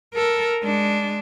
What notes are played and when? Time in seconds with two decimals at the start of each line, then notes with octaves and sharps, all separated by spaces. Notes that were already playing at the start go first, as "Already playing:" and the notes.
0.15 A4 A#4
0.63 G#3 D4